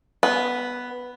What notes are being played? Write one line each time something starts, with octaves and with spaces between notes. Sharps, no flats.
B3